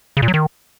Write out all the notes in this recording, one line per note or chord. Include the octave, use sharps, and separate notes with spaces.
C#3
A#2
F#3
D#3